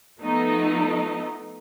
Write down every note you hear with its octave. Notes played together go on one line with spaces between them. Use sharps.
F3 A3 B3 D#4